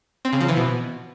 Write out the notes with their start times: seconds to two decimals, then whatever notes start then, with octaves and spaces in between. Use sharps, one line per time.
0.25 C4
0.33 C#3
0.41 F3
0.49 E3
0.56 B2